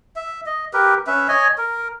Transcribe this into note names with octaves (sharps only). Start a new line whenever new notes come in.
E5
D#5
G4 A#4 B4
C#4 B4 E5
C#5 D#5 G#5
A#4